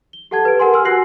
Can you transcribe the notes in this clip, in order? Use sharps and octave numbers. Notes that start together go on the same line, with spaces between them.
G7
G4 A4 F#5 A5 G#6
B4 D7
G4 A#4 F#5 G#5 C6
G#5 C6 E6 F6
F#4 F#5 F#6 A#6 C7 F#7